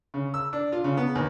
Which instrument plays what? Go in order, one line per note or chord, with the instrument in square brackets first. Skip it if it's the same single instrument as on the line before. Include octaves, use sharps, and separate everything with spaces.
[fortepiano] C#3
E6
D4
F4
C#3
B3
D#2